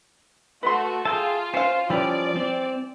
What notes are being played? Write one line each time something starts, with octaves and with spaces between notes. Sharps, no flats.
A3 F#4 B4 C6
F4 G#4 E5 G5 A5
C#4 C5 F5
E3 F3 G3 C#4 D5
C4